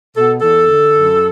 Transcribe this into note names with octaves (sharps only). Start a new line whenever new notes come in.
B2 A4
E2 A4
D3
F#2